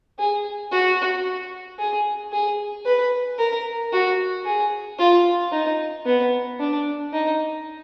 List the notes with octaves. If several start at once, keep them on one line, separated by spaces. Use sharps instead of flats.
G#4
F#4
G#4
G#4
B4
A#4
F#4
G#4
F4
D#4
B3
D4
D#4